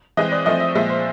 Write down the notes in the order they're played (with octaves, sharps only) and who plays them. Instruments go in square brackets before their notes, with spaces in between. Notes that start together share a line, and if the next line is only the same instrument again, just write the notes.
[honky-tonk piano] E3 G#3 C4 D#5
D5
F3 A3 C4 D#5
E5
A#2 F3 G#3 E5
C5